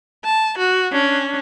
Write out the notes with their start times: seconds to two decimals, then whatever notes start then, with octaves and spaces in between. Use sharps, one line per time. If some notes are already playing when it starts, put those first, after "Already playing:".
0.25 A5
0.58 F#4
0.92 C#4 D4